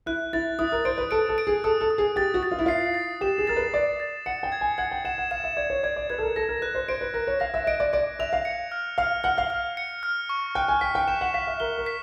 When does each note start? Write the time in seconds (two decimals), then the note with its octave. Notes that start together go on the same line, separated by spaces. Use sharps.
0.06 E4 F#6
0.33 E4 A6
0.59 E4 D#6
0.72 A#4
0.85 C5 D7
0.98 B4
1.11 A4 D7
1.29 A4
1.38 D7
1.47 G#4
1.64 A4 D#6
1.81 A4
1.90 D#6
1.98 G#4
2.16 G4 A6
2.34 F#4
2.43 A6
2.51 F4
2.59 E4
2.66 F4 C7
2.94 A6
3.21 G4 E7
3.38 G#4
3.47 A#4 A6
3.56 B4
3.74 D5 A6
4.00 A6
4.26 F#5 C#7
4.43 G5
4.52 G#6
4.61 G#5
4.78 F#5 G#6
4.92 G5
5.05 F#5 E7
5.18 F#5
5.31 F5 E7
5.44 E5
5.57 D5 G#6
5.70 C#5
5.83 D5 G#6
5.96 D5
6.10 B4 G#6
6.18 A4
6.23 A#4
6.36 A4 A#6
6.49 A#4
6.61 B4 F#6
6.75 C5
6.88 C5 D7
7.01 B4
7.14 A#4 A#6
7.27 C#5
7.40 F5 A#6
7.54 E5
7.67 D#5 D7
7.80 D5
7.93 D5 D7
8.19 E5 F7
8.33 F5
8.45 C#7
8.72 F6
8.98 F5 F6
9.24 F#5 F6
9.38 F5
9.50 F6
9.77 C#7
10.03 F6
10.29 C#6
10.55 G5 F#6
10.68 G#5
10.81 G5 B6
10.95 G5
11.08 G5 E7
11.21 F#5
11.34 F5 B6
11.47 E5
11.60 A#4 G7
11.78 A#4
11.86 B6